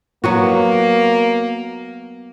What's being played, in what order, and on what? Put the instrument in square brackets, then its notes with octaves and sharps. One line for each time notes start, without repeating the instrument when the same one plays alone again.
[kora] F#3 B3 F#4 [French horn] A#3